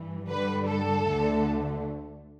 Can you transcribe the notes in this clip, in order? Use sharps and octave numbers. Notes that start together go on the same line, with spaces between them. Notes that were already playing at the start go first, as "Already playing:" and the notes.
Already playing: G2 E3
G2 D3 G3 B4
A4
D2 D3 A3